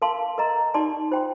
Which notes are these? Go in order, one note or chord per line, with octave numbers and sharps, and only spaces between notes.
A#4 F5 A5 C6
A#4 D#5 A#5
D#4 G4 D5 A5 C6
F4 C5 G5 C6